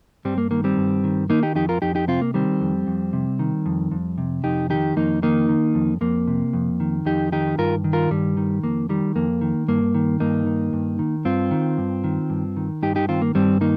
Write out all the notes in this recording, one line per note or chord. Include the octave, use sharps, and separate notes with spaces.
G2 G3 C4
A#3
D#3 A#3
G3 C4
G2
D#3
D#3 A#3 D#4
D#4 G4
F2 D#4 G4
F4 A#4
F2 D#4 G4
D#4 G4
C3 C4 F4
A#3
D#3 G3 C4
F2
F2
C3
D#3
F2
F2
C3
F2 D#4 G4
D#3 D#4 G4
F2 A#3 D#4
D#3 A#3 D#4
D#3
F2
F2 A#3
C3
F2
D#3
F2 D#4 G4
D#3 D#4 G4
G2 F4 A#4
D#3
F4 A#4
G2 G3
D#3
F2 A#3
D#3 G3
F2 A#3
D#3
G2 A#3
D#3
G2 A#3 D#4
D#3
G2
D#3
G2 C4 F4
D#3
G2
D#3
G2
D#3
G2 D#4 G4
D#4 G4
D#3 C4 F4
A#3
G2 G3 C4
D#3 A#3 D#4